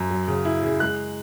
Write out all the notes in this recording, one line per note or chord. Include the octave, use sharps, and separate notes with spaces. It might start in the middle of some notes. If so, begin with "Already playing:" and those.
Already playing: F#2
F#3
C#3
E4
C#3
G#3 F#6